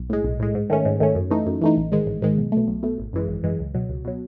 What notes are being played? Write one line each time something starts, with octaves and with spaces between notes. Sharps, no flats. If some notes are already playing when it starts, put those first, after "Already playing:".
Already playing: B1
A2 G#3
B1
A2 G#3
G#2
D#3 A3 C#4
G#2
D#3 A3 C#4
F#2
E3 A3 D#4
F#2
E3 A3 D#4
A1
G#2 D#3 G#3
A1
G#2 D#3 G#3
B1
B2 A3
B1
B2 A3
G#1
F#2 E3 G#3
G#1
F#2 E3 G#3
C#2
B2 F#3
C#2
B2 F#3